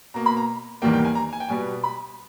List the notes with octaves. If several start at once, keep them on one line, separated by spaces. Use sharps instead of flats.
B2 A#3 A#5
B5
A#5
E2 D#3 G3 A#3 G5
G5
G#5
A#5
G#5
G5
B2 G3 B3 G#5
B5